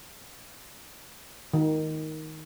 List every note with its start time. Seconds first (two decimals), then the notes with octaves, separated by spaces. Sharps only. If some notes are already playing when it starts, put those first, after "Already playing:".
1.54 D#3